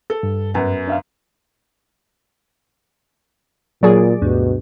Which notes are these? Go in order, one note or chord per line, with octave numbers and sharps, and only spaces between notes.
A4
G2
F#2 B3
D4 E5 F5
A#2 F#3 G#4 D5
D2 G2 B2